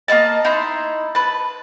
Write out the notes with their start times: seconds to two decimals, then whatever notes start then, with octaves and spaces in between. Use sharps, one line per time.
0.08 A#3 C4 D#5 A5
0.45 D#4 E4 C6
1.15 B4 A5